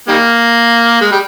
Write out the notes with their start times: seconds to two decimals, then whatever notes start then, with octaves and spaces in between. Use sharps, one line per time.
0.08 D#3 G3 A#3
1.01 G#3
1.11 G3